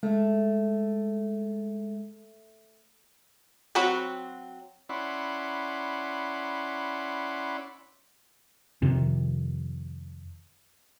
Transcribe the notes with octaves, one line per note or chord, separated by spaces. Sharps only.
G#3 A3
F#3 C4 F#4 F#5 B5
C#4 E4 D5 F#5 B5 C6
F2 C3 D#3